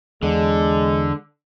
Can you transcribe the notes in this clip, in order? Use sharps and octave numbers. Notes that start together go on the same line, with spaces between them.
E2 D3 G#3